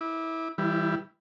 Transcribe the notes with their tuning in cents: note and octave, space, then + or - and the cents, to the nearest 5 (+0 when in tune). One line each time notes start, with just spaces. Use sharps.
E4 -20 D6 +20
E3 -20 G3 +0 E4 +35